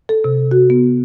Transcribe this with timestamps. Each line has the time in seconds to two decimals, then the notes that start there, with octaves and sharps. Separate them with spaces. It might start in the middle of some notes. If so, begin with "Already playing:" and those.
0.09 A4
0.24 C3
0.51 F#4
0.70 B3